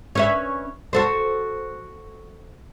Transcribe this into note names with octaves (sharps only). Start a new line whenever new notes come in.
C#4 B4 E5
F#4 A4 C5